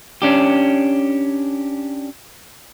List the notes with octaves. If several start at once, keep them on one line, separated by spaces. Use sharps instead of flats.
C#4 D4 G4